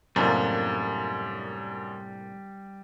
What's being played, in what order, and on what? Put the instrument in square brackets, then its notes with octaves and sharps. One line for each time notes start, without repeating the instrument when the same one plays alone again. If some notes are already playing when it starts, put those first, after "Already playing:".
[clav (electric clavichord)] C2 A2 A#3 [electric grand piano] F#2 [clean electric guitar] G3 D4